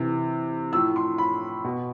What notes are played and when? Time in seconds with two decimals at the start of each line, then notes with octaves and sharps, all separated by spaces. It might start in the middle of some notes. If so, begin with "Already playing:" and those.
Already playing: C3 E3
0.73 A2 F3 E6
0.96 C6
1.18 B5
1.64 B2